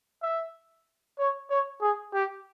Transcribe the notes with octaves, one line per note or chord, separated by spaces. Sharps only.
E5
C#5
C#5
G#4
G4